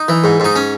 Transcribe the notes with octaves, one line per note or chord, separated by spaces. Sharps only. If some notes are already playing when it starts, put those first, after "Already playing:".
Already playing: D#4
E3
G#2
G#2 D#4
C#4